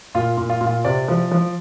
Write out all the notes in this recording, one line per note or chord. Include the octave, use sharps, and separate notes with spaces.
A#2 F4
A#2
F4
A#2
F4
C3 D5
F3
F3